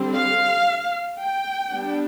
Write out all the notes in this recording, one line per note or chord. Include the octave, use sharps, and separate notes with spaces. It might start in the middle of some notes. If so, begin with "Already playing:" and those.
Already playing: D3 G3 C4
F5
G5
G3 B3 D4